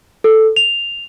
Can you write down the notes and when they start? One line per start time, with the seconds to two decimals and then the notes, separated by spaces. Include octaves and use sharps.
0.24 A4
0.56 F7